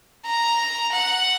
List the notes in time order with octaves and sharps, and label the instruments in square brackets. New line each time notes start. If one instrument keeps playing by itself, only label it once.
[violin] A#5
F#5